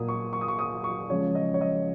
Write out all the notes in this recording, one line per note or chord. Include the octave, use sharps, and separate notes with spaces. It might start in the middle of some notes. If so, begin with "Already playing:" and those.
Already playing: A#2 A#3 D#6
C#6
C#6
D#6
C#6
D#6
C#6
C#3 F3 G#3 C#5
D#5
C#5
D#5